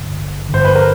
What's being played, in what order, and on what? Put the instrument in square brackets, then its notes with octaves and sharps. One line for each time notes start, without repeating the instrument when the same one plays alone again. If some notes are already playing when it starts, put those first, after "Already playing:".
Already playing: [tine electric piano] G#1 G2 D3
G#1
[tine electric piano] G2 D3 [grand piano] C5
[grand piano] B4
A#4